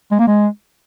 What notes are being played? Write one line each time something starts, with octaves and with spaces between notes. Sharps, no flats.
G#3
A#3
G#3